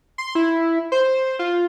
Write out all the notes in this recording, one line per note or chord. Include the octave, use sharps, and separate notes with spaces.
C6
E4
C5
F4